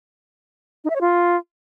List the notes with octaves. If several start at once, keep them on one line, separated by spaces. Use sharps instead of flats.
D#4
E5
C#5
F4